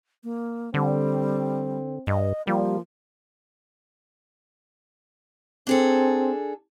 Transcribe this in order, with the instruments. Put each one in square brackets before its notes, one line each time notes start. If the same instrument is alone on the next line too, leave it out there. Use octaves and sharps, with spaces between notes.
[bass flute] A#3
[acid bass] D3 [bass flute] G3 [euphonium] C4
[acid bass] G2 [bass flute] D#5
[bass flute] F3 [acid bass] G3 [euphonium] A#3
[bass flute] C4 [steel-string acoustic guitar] D4 G#4 A4